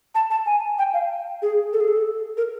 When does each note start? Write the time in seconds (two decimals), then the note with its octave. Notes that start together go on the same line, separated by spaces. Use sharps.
0.15 A5
0.31 A5
0.46 G#5
0.79 G5
0.94 F5
1.42 G#4
1.73 A4
1.80 G#4
1.88 A4
2.37 A#4